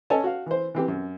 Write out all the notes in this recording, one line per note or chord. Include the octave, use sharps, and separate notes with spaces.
C#4 A4 C#5 D#5 G#5 A5
F#4 F5
E3 C5
E3 C4 G4
F#2